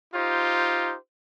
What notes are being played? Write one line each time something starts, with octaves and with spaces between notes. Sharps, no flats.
D#4 F4 G4 C5